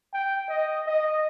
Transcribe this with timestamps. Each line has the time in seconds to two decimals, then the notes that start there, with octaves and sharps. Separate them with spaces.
0.13 G5
0.49 D#5
0.87 D#5